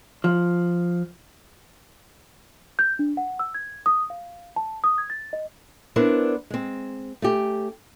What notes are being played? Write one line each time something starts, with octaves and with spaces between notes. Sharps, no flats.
F3
G6
D4
F#5
E6
G#6
D#6
F5
A5
D#6
G#6
A6
D#5
B3 D4 E4 A#4 C5
G#3 C4
A3 C#4 G4